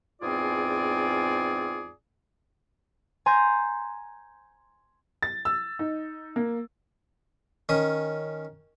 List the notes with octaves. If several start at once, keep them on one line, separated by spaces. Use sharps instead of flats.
E2 G#2 C4 F4 G#4 D5
G#5 A#5 C6 G6 G#6
A6
E6
D#4
A#3
D#3 C#4 D#6